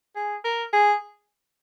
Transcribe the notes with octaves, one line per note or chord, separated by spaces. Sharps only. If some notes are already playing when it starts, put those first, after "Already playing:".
G#4
A#4
G#4